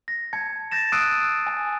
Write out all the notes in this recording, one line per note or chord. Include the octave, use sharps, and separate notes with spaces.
A#6
A5 G#6 C#7
G6 A6 A#6 E7
D#6 E6 F#6 C7 D7 D#7
G#5